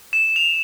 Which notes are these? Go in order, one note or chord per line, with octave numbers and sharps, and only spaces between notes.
E7
F7